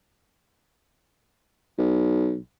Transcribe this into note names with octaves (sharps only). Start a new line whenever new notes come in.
B1